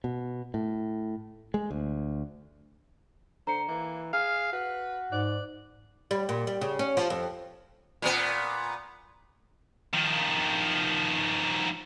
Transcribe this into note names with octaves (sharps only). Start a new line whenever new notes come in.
B2
A2
G#3
D2
D3 C5 A#5 C#7
E3 A#3
G#4 F5 F6
F#4 B4
G#2 D5 F#6
G3
A#2
G3
C#3
C#4
F3
F2
A#2 B3
D#3 F3